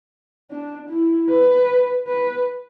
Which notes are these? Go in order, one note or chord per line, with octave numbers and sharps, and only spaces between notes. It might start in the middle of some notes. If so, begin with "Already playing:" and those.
D4
E4
B4
B4